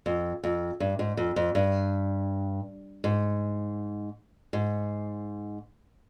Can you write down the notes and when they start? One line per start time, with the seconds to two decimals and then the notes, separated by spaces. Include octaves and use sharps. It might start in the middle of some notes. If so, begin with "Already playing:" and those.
0.06 F2
0.44 F2
0.80 G2
0.99 G#2
1.17 F2
1.36 F2
1.55 G2
3.04 G#2
4.53 G#2